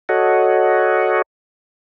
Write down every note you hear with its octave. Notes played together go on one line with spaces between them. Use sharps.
F#4 A4 C#5 D#5 F#5